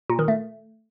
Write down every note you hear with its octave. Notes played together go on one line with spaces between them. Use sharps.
A#2
D#3
A3